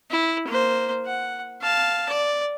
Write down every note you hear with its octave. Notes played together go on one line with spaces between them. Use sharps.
E4
A#3 C5
F#5
F5 A5
D5